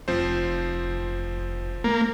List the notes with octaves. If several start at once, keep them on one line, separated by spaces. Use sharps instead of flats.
F1 F3 C4 C5
A3 A#3